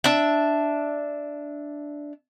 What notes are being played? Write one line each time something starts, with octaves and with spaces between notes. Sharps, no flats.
D4 E5